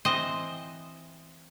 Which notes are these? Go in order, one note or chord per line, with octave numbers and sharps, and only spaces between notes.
E3 C4 C5 D#5